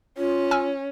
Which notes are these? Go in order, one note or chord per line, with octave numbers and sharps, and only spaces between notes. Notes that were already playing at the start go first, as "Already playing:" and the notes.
C#4 F4
G#5 E6 F6